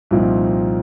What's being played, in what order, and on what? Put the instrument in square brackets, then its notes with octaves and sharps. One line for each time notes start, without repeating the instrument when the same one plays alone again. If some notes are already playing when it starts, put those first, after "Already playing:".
[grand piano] C2 A#2 F3 C4 D#4